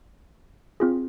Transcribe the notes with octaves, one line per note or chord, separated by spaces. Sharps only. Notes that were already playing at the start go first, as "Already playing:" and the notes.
C4 F4 G#4